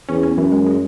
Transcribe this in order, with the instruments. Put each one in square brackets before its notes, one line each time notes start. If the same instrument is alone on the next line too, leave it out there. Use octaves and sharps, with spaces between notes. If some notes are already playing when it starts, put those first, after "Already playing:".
[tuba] E2 [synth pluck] C#4
[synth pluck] C#4
[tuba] F#2 [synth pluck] E3
[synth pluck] G#3
G#3